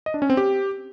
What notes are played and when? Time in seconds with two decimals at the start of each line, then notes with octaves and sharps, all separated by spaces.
0.06 D#5
0.14 D4
0.22 C#4
0.30 C4
0.37 G4